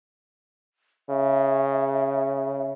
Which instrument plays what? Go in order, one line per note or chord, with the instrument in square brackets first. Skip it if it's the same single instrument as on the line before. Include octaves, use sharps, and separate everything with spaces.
[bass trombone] C#3 [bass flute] E5